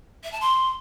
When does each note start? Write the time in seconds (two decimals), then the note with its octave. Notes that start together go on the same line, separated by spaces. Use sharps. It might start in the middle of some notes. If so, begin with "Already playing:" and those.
0.24 E5
0.32 A5
0.41 C6